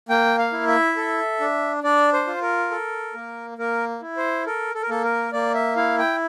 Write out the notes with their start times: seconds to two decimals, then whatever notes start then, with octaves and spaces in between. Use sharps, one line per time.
0.09 A#3 G5
0.38 F5
0.52 E4
0.68 E5
0.96 A4
1.40 D4
1.84 D4 D5
2.13 C5
2.27 F4
2.42 A#4
2.71 A4
3.14 A#3
3.58 A#3 A#4
4.02 E4
4.17 C5
4.46 A4 A#4
4.75 A4
4.82 A#4
4.89 A#3 A4
5.04 A#4
5.33 A#3 D5
5.54 E5
5.76 E4 F5
5.98 G5